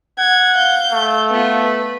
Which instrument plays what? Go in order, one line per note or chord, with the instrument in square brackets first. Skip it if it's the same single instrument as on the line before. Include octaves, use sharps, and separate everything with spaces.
[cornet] F#5 [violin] G#6
[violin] F5 G6
[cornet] A3
[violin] B3 F4
B4